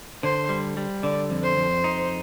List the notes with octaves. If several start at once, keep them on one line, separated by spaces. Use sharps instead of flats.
D3 C5
G3
G3
D3 D5
F2
C5
F2
D#4